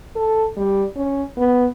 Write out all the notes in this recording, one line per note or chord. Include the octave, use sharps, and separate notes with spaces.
A4
G3
C#4
B3